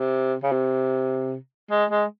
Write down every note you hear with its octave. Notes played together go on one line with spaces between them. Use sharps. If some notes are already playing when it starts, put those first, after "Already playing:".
Already playing: C3
C#3
C3
G#3
G#3